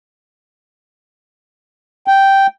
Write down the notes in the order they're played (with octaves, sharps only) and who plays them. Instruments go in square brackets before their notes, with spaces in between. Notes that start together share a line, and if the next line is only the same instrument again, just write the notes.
[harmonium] G5